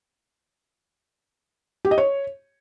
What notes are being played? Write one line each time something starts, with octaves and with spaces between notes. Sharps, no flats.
G4
D#5
C#5